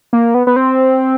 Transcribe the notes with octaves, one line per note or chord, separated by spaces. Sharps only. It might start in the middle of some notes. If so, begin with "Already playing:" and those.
A#3
B3
B3
C4